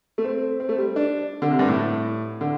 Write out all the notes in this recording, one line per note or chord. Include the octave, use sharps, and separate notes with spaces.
A3
C4
C4
A3
G3
D4
D3
C3
G2
A2
D3